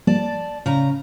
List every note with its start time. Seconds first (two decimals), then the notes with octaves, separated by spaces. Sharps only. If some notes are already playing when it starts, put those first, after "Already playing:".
0.07 F3 G3 A#3 D5 A5
0.66 A2 C#3 A#5